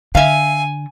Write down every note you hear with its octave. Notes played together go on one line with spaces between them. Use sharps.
D3 E5 F5 G#5